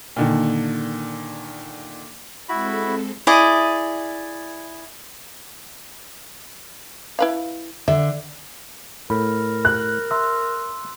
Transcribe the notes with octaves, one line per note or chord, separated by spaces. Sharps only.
A#2 D3 D#3
G#3 C4 E4 F#4 A4 B5
E4 G#4 D5 D#5
E4 B4 F5
D3 E5
A2 A#4 B5
F#6
E5 A#5 C6 E6